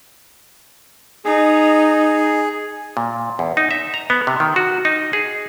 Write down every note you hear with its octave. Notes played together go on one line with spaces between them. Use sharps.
D#4 G#4
A#2
E2
D#4
E5
A#5
B3
C3
D#3
F#4
D#4
G#4